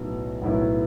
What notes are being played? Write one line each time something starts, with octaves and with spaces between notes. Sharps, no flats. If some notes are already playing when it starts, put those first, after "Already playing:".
Already playing: B1 A2 F#3 B3 E4
B1 A2 F#3 B3 E4